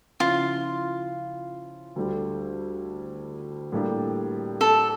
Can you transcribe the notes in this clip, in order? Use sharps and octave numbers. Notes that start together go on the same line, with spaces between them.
C#3 F3 C#4 E4 F4
D2 D3 G3
A2 G3 A#3 D4 G4
A4